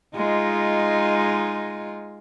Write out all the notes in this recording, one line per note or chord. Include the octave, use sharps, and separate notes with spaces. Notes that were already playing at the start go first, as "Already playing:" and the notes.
G#3 D#4 F4